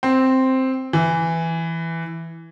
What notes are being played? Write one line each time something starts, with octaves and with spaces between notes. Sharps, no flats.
C4
E3